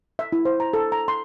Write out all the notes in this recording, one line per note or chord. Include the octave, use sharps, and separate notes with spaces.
E5
E4
C5
A#5
A4
A#5
C6